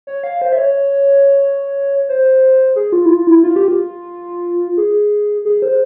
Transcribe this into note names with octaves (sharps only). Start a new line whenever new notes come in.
C#5
F5
C5
E5
C#5
C5
G#4
F4
E4
F4
E4
F4
G4
F4
G#4
G#4
C5